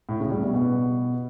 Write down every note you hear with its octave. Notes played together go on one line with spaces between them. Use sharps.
A2
C#3
G3
B2
B2